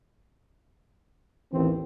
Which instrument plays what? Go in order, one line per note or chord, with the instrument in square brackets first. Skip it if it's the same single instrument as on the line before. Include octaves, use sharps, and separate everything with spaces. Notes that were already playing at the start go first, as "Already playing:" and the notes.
[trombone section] A1 D#2 C4 [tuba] E3